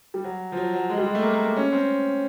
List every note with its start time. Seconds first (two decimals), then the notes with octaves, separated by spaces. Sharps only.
0.14 G3
0.24 F#3
0.52 F3
0.57 F#3
0.74 F#3
0.90 G#3
0.98 G3
1.06 G#3
1.15 A3
1.23 A#3
1.34 A#3
1.45 A#3
1.57 C#4
1.73 C4